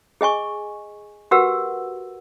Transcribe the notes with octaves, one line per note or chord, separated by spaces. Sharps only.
G#4 D#5 G#5 C#6
F#4 G4 A#4 B4 F#5 E6